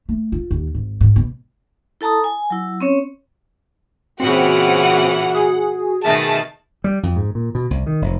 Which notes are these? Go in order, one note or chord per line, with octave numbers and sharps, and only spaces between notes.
A3
F4
D#2
G#1
G#2
B2
E4 A4 A5 A#5 D#6
G#5
F#3 E4
C4 C#4 C#5
A#2 C#3 E3 C4 F#4 F#5
G#4
B2 D#3 A3 E5 A5
G3
F2
G#2
A#2
B2
C2
D#3
F1